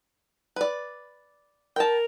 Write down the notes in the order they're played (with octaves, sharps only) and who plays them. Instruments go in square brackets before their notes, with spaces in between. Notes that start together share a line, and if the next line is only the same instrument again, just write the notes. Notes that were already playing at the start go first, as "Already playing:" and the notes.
[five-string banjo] B4 D5
[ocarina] A#4 [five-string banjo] G5 A5